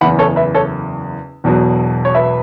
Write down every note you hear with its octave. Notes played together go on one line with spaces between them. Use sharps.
F#1 E2 E3 F#5 B5
A4 C#5
B4 E5
A4 C#5
E1 E2 B2 F#3
C#5
B4 E5